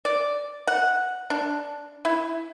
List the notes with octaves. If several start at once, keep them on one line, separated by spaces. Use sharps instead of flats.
D5
F#5
D4
E4